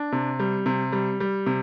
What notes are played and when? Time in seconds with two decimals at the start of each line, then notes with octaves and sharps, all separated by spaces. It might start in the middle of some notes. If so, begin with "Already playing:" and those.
Already playing: D4
0.12 C3
0.39 G3
0.66 C3
0.92 G3
1.20 G3
1.46 C3